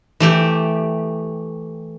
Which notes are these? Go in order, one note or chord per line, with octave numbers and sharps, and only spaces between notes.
E3 A3 G4